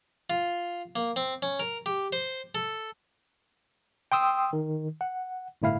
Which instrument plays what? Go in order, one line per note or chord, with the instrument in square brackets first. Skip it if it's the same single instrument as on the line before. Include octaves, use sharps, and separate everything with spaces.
[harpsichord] F4
A#3
C4
C#4
A#4
G4
C5
A4
[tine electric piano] G5 C6 D#6 E6
D#3
F#5
G1 A2 E4 F5